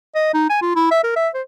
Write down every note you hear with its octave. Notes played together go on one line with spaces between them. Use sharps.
D#5
D#4
G#5
F4
E4
E5
A#4
E5
C5